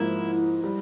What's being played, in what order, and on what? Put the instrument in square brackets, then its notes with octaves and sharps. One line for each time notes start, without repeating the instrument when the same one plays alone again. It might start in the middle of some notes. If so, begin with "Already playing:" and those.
Already playing: [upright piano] G#2 F3 A#3 [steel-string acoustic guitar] E4
[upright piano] G3